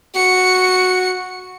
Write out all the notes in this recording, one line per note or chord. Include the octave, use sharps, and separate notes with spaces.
F#4 C#7